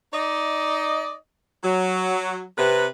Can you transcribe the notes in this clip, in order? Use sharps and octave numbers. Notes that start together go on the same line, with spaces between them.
D#4 D5 D#5
F#3
C3 B4